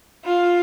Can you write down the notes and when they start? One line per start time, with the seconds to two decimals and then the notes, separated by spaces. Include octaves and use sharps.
0.25 F4